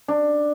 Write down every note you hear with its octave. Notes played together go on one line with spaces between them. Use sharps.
D4